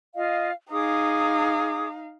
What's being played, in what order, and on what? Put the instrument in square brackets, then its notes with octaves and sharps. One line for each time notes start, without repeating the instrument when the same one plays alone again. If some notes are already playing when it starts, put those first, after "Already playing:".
[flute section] F4 D#5 F5
[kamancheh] D#4 F5 [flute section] G#4 D6 D#6